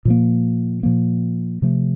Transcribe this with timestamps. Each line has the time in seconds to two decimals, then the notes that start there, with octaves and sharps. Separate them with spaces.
0.05 A#2 F3 A#3
0.83 A#2 F3 A#3
1.62 C3 F3 A3